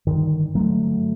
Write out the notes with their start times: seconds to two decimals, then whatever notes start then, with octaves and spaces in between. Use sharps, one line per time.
0.07 G2 D3 D#3
0.55 G2 D3 F#3 A3